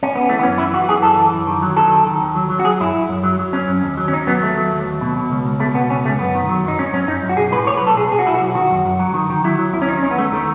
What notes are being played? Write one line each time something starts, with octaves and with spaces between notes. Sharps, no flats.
C#4
B3
E3 A3
B3
F#2 C#4
E3 E4
E3 F#4
E3 G#4
F#2 A4
E3
F#2
D#3
F#3
D#3 A4
D#3
D#3
D#2
F#3
F#3
F#4
F#3 G#4
F#2 E4
F#2
F#2
F#3
F#3
F#2 C#4
F#2
D#2
F#3
C#4
D#2 D#4
F#3 B3
D#2 A3
F#3
D#2
D#2
B2
B2
C#2
C#2
B2 A3
B2 B3
C#2 C#4
C#2 A3
F#2 B3
D#3
F#3
F#2 D#4
F#2 C#4
F#2 C#4
F#2 D#4
F#2
F#4
B1 G#4
A2 B4
B1 C#5
B4
B1
A4
B1 G#4
B1 G#4
F#4
B1 E4
F#4
B1
D#3 F#4
F#2
F#2
F#3
D#3
D#3
F#3 E4
F#3
D#2 E4
C#4
D#3 D#4
D#2 C#4
B3
D#2 A3
D#3 A3